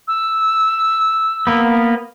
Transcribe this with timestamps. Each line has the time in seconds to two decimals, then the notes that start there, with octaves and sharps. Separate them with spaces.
0.08 E6
1.47 A#3 B3